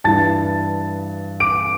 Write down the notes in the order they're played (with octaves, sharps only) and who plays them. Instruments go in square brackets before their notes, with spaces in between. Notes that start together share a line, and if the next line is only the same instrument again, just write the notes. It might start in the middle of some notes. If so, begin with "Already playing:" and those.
[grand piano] G2 E3 A5 A6
D6 D7